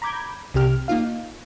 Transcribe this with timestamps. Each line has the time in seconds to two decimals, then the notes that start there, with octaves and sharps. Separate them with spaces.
0.02 A#5 B5 D6 G6 G#6
0.54 C2 C3 G4 F6
0.88 A#3 D#4 F4 F5